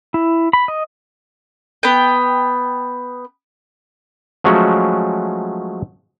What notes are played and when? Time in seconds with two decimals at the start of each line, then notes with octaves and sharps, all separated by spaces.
0.14 E4
0.53 B5
0.68 D#5
1.83 B3 G5
4.44 F3 F#3 G#3 A3 C#4 F#4